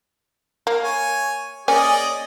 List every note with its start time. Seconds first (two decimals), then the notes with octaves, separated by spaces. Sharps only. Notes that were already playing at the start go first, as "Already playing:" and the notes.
0.67 A#3
0.83 C#5 G#5
1.68 A#3 C#4 G#4 D5 D#5 G#5